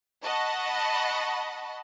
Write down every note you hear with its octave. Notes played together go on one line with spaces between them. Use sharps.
D#5 F#5 A5 B5 C#6